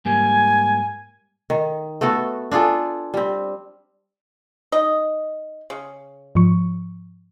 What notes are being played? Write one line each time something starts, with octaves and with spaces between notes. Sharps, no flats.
G#2 G3 A#3 G#5
D#3
A3 B3 F#4 A4
D4 F4 G#4 A4
G3 C4
D#4 D#5
C#3
G#2 F3 C#6